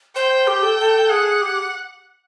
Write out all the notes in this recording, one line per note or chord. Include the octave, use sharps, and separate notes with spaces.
C5 G5
G4
A4
A4
G#4 F#5
G4